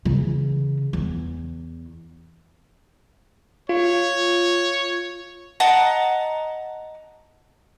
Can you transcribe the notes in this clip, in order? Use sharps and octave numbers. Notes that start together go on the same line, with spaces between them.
C#3 E3
E2
F4 C#5
D#5 F#5 A5 A#5